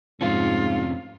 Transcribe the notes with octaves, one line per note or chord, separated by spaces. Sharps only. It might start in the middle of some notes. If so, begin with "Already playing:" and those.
F2 G#2 C3 C#4 F4